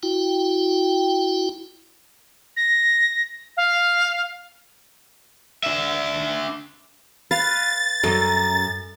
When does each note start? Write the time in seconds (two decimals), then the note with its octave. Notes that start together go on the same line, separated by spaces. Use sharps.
0.03 E4 F#4 G5
2.57 A#6
3.57 F5
5.63 D4 E5
7.31 B4 F5 A6
8.04 F#2 A4 D#5 G#5 A#5